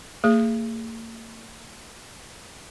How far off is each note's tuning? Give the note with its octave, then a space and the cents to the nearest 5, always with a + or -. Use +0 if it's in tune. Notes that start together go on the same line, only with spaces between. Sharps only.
A#3 -45 G#4 +0